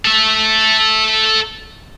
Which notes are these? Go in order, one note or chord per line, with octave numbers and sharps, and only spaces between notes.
A4 E5